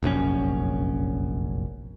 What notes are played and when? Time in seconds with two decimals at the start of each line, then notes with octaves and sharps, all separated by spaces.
0.03 F1 A#1 F#2 C#4